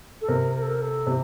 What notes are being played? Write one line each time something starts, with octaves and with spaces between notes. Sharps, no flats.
A4
C3 A#4
A#4
A4
A#4
A4
C3 G4